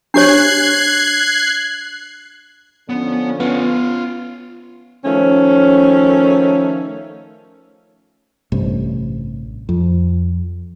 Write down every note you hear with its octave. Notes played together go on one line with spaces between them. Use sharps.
D4 G4 C#5 F#6 G#6 C7
D3 F3 B3 C#4
B3 F4 F#5
D#3 F3 A3 C#4
A1 G2 C3
F2